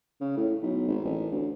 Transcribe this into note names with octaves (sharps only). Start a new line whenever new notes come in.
C#3
A2
B1
G#1
A1
D2